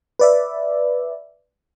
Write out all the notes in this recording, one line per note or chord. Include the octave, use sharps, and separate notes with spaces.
B4 D5 E5